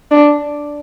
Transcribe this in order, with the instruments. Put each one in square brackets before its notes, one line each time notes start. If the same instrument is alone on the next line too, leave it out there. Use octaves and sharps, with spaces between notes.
[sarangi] D4